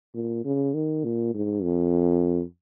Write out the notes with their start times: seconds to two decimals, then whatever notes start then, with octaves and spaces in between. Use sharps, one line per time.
0.14 A#2
0.45 C#3
0.74 D#3
1.04 A#2
1.34 G#2
1.63 F2